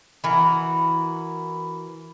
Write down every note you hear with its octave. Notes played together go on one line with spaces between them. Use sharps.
E3 F#4 A#4